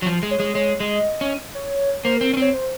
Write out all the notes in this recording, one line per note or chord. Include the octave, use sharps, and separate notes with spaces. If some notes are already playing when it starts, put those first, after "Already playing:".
F#3
F3
G#3
C#5
G#3
G#3 C#5
G#3 D#5
C#4
C#5
A#3 C5
A#4
C4
C#4
C4 C#5
C5